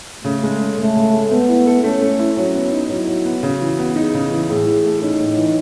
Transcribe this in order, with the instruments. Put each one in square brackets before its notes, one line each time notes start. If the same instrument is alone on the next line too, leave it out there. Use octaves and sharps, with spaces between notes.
[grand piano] C#3 [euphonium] A3
[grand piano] G#3
C#4
[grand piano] C#3 [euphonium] A3
[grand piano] C#3
G#3
[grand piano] A3 [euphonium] B3
[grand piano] E4
A4
[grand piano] A3 [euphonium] C#4
[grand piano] A3
E4
[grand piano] F#3 [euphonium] C#4
[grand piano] B3
D#4
[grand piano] F#3 [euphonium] E4
[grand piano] F#3
B3
[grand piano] C#3 [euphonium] F#4
[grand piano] E3
B3
[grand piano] D#4 [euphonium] G#4
[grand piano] C#3
E3
[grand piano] A2 [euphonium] G#4
[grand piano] E3
A3
[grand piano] C#4 [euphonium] D#4
[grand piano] A2
E3